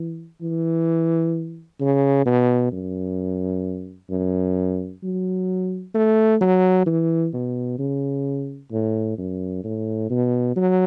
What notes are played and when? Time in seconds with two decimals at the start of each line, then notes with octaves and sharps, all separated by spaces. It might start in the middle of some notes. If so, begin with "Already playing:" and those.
Already playing: E3
0.41 E3
1.80 C#3
2.26 B2
2.72 F#2
4.10 F#2
5.03 F#3
5.94 A3
6.41 F#3
6.86 E3
7.33 B2
7.79 C#3
8.72 A2
9.18 F#2
9.64 A2
10.10 B2
10.56 F#3